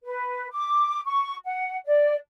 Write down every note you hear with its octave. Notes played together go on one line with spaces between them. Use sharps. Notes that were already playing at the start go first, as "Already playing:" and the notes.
B4
D6
C#6
F#5
D5